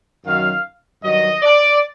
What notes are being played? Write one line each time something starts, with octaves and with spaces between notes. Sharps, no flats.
F#2 D#3 F#3 F5
G2 D#3 F#3 D#5
D5